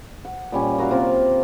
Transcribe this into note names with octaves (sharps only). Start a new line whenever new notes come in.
F#5
A#2 G3 C#4
F#4 A#4 E5 F5
C3 A#3 F4